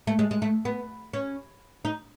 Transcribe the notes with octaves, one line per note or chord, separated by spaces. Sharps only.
A3
G#3
G#3
A3
B3
C#4
D#4